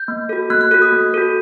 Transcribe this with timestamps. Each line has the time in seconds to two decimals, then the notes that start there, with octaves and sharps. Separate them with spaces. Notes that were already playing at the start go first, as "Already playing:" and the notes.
Already playing: G6
0.08 A#3
0.29 F#4 A4
0.50 A#3 F#6
0.61 F#6
0.71 A4 F#6
0.74 F#4
0.82 D#6
0.92 A#3
1.14 F#4 A4